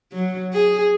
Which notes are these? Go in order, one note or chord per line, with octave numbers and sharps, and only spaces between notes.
F#3
G#4